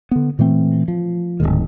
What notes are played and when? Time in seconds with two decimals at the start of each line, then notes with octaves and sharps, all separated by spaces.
0.11 D3 B3
0.39 A#2 E3 A3 C4
0.88 F3
1.40 D1 C#2 G#2 D#3